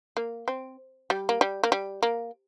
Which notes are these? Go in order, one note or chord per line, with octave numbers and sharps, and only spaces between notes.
A#3
C4
G3
A#3
G3
A#3
G3
A#3